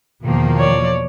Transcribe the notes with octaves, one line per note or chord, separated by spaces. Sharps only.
E2 B2 D#3 F3 A#3
C#5 D5